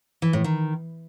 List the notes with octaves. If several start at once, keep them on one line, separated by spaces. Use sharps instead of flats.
E3
A2
D#3